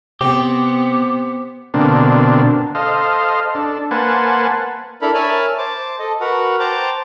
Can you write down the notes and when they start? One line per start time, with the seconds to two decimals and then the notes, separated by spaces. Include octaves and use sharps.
0.21 C3 B3 C4 G4
1.74 B2 D3 A#3 C4 D4
2.75 A4 C5 D#5 F5
3.55 D4 A4
3.91 A#3 B4 C5 F#5 G#5 A5
5.02 D4 E4 A4 A#4 B5
5.14 A#4 C#5 E5 G#5 A5 B5
5.58 C5 A5 D6
5.99 A4 D#5
6.20 F#4 A#4 B4 F#5
6.60 C5 G5 A5 A#5 D6